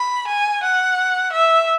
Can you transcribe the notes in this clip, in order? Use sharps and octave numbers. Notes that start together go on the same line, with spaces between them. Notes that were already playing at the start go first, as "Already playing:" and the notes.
Already playing: B5
G#5
F#5
E5